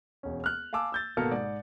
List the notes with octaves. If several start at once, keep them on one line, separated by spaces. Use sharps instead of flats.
E1 C#4
F6 F#6
F5 G#5 A5 D6 E6
E6 G6 A6
G#1 B2 A#3 A4 F6 C#7
G#2 D5